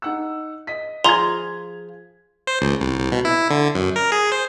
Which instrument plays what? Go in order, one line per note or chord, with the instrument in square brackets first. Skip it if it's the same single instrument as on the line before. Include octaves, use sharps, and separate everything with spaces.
[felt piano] D#4 F#5 E6
D#5 B6
[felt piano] F3 G#6 [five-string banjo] F4 G#4 A#5 [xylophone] C6 F7
[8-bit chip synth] C5
C#2
C2
C2
B2
E4
D3
F#2
A#4
G#4
C5